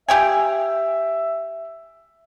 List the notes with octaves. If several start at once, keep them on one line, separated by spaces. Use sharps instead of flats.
G4 E5 G5 G#5